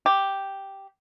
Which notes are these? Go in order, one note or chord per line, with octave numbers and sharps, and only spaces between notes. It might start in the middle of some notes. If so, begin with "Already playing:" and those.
G4